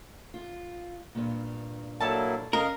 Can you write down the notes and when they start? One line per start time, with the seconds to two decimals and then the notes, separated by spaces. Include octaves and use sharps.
0.34 F4
1.15 G2 A#2
2.00 F#3 A#3 E4 A4 D5 A5
2.53 C#4 A#4 D#5 F5